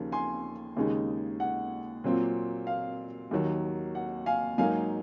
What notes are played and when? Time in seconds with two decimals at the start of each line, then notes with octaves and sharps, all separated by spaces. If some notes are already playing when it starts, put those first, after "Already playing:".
Already playing: D#2 C#3 F3 A#3 D#4
0.12 G#5 C6
0.76 D#2 C#3 G#3 D#4
1.40 F#5
2.04 A#2 F#3 C4 F4
2.67 F5
3.31 D#2 D#3 F#3
3.95 F#5
4.26 F5 G#5
4.58 G#2 F#3 A#3 D#4 F5 G#5